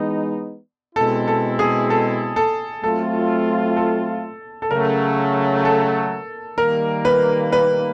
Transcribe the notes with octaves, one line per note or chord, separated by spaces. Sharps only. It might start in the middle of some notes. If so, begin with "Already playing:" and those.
Already playing: E3 G#3 B3 D#4
B2 G#3 C4 E4 A4
A4
G#4
A4
A4
F#3 A3 C4 F4 A4
A4
A4
C#3 F#3 A3 A#4
A4
D#3 G3 A#3 A#4
B4
B4